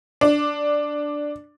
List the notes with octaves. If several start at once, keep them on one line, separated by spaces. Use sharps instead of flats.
D4